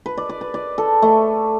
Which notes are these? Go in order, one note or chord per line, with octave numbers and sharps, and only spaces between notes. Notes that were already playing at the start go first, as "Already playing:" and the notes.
B4
D5
D5
B4
D5
A4
A3